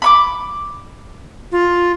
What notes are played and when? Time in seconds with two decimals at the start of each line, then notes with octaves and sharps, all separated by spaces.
0.02 B5 C#6 D6
1.52 F4